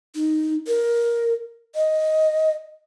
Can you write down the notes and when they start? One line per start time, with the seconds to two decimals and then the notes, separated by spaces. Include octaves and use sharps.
0.15 D#4
0.67 A#4
1.75 D#5